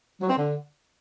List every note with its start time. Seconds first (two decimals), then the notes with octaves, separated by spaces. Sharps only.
0.21 F#3
0.29 C4
0.38 D3